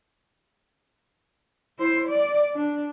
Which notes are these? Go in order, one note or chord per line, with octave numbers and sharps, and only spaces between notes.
E4 C5
D5
D4